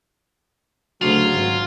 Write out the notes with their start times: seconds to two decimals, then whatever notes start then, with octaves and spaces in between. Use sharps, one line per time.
1.01 D2 C#3 F#3 D4 F4
1.34 G#1